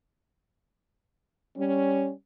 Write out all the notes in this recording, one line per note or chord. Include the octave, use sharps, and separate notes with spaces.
G3 C#4